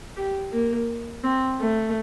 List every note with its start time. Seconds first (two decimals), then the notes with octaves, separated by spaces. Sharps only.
0.16 G4
0.52 A#3
1.24 C4
1.61 A3